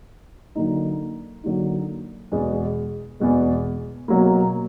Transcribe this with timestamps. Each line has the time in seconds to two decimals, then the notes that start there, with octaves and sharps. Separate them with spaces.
0.55 D3 F#3 A#3 D#4
1.43 D3 F#3 A#3 D#4
2.32 E2 B2 G#3
3.20 E2 B2 G#3
4.08 B2 F#3 A#3